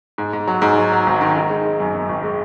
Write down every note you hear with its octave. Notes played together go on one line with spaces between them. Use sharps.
G#2
G#2
F#3
G#2
F#3
F#3
G#1
D#3
D#3
G#3
G#3
F#2
F#2
G#1
G#3